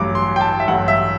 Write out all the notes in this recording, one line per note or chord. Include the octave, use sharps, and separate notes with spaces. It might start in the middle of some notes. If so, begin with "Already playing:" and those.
Already playing: A1 G2 F#3 D6
C6
G5
A5
E5
A1 G2 F#3 F#5
E5